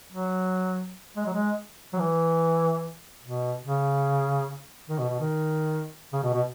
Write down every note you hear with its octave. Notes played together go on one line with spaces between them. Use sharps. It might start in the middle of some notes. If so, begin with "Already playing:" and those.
F#3
G#3
F#3
G#3
F#3
E3
B2
C#3
D#3
B2
B2
D#3
C#3
B2
B2